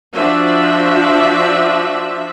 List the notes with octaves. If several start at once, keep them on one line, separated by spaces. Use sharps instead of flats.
F3 D4 F#4 E5